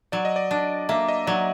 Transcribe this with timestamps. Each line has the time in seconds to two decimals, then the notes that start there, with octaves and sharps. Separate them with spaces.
0.12 F#3 D5
0.25 D#5
0.36 D5
0.51 D4
0.89 A#3 E5
1.08 D#5
1.27 F#3 D5